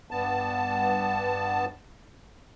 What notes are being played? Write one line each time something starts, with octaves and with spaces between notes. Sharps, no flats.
G2 B3 A5